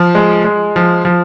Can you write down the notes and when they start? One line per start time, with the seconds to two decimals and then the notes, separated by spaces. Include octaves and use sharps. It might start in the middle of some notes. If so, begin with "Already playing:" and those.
Already playing: F3
0.15 G#3
0.44 G#3
0.76 F3
1.05 F3